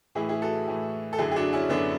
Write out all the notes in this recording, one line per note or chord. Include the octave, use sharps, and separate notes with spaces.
A2 E3 E4 G#4
E4 G#4
F#4 A4
A2 E3
A4
F#2 D3 E4 G#4
G#4
D4 F#4
C#4 E4
F#2 D3 B3 D4